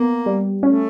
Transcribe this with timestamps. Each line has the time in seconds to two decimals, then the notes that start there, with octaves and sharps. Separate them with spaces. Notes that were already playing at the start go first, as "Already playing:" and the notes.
Already playing: A#3 B3
0.26 G3
0.62 A3 C#4